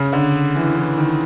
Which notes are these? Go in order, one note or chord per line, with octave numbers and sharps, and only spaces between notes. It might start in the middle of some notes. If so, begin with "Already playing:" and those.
Already playing: C#3
D3
E3
E3
D#3